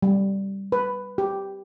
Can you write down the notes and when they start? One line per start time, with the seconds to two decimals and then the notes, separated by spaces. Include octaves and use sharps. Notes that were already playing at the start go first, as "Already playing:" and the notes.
0.02 G3
0.72 B4
1.18 G4